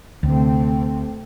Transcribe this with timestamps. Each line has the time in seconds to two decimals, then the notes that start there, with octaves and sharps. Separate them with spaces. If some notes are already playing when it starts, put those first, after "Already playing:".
0.23 D2 C3 A3 C4